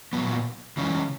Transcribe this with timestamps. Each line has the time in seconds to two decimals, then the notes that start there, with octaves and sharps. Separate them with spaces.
0.13 A#2 F#3 B3
0.77 C#3 E3 G#3 C#4